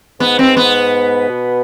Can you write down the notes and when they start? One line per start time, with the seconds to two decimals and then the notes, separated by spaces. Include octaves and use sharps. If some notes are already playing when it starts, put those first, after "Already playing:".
0.20 G#2 B3
0.39 C4
0.57 B3
1.29 B2